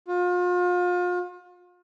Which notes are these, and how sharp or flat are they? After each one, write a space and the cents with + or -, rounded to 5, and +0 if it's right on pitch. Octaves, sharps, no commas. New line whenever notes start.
F4 +35